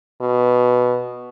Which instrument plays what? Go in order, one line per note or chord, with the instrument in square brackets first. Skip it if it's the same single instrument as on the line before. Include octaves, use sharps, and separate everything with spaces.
[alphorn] B2